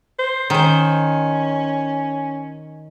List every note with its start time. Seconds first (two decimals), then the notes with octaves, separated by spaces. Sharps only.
0.19 C5
0.50 D#3 C#4 C5